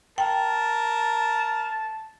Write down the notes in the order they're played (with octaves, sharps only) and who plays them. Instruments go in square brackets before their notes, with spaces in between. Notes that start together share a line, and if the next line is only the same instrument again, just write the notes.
[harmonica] A#4 [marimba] G5 [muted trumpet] A5